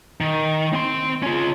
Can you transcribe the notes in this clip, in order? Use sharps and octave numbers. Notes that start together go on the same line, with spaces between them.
D#3
C4 C6
C#4 F4